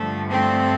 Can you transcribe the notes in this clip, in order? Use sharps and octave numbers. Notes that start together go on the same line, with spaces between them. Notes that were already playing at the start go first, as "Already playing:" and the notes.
Already playing: G2 D3 F3 A3
A3 C4